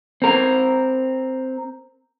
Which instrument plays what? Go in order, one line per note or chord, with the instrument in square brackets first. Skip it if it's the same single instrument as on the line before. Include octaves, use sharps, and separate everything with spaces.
[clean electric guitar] C4 A#4